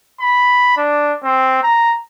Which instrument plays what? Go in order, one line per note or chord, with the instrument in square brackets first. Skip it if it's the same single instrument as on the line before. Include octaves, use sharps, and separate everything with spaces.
[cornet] B5
D4
C4
A#5